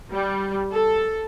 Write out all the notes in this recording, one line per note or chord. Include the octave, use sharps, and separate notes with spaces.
G3
A4